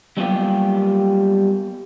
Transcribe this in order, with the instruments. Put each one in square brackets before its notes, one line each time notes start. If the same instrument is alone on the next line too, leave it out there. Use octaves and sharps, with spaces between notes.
[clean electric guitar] F#3 G3 A#3 B3 F4 G4